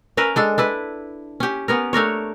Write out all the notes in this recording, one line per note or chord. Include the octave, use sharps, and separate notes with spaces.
C#4 A#4 B4 E5
G#3 D4 A4
D4 E4 B4
C#4 G4
B3 C#4 A#4
A3 D4 A#4 C#5